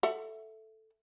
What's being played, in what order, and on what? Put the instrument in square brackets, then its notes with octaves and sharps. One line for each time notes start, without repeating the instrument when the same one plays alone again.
[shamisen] A4 E5 F#5